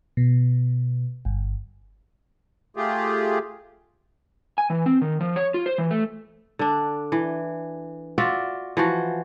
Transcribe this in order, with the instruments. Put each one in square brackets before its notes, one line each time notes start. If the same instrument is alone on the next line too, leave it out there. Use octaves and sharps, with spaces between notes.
[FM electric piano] B2
G1
[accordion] A3 F4 G4 G#4
[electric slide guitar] G#5
E3
C4
D#3
F3
C#5
F4
C5
E3
A3
[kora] D3 D4
E3
F4 F#4 D5 E5
E3 F3 F#4